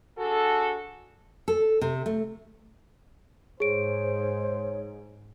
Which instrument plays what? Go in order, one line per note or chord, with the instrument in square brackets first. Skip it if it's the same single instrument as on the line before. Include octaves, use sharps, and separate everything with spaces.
[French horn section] D4 F#4 G#4 A4
[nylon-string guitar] A4
C3
A3
[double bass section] G#2 [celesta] G#4 D7 [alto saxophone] C5 [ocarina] C#5